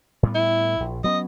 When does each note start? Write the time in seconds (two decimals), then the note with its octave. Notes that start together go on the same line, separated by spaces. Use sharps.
0.23 A2 G3 B3
0.35 E4
0.80 A#1
1.04 F#3 B3 C#4 D#5